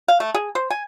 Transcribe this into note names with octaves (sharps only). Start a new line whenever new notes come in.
F5
A3
G#4
C5
G#5